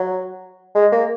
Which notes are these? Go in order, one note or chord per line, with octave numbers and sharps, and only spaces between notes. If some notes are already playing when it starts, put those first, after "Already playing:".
Already playing: F#3
G#3
A#3